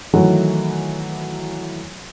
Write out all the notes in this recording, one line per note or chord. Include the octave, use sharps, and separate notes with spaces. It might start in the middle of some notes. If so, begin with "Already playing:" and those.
D#3 E3 F#3 A3 F#4 C#5